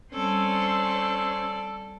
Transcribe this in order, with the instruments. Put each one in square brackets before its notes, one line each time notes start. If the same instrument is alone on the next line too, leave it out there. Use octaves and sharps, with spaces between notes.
[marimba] G3 C4 [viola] C#4 C5 [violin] A4 D5 [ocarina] E6